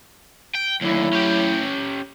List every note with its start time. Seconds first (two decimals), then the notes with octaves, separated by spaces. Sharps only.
0.55 G5
0.81 D#2 D3 F#3 A3 E4
1.13 C#4 G4